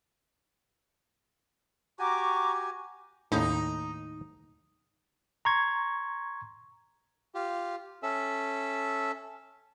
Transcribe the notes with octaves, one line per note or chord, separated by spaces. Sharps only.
F#4 G4 G#5 A#5 C#6 D6
D#2 A2 D#4
A#5 C6 C#6 G#6
F4 G4
C#4 A4 E5